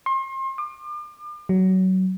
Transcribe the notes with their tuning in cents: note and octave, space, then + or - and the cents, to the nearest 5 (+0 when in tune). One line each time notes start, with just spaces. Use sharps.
C6 +35
D6 +40
F#3 +20